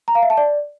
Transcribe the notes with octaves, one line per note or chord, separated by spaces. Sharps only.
A#5
F5
E5
A5
D5